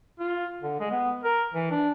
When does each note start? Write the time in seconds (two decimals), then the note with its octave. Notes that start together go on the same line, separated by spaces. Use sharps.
0.19 F4
0.62 D3
0.80 G#3
0.91 B3
1.24 A#4
1.54 E3
1.71 D4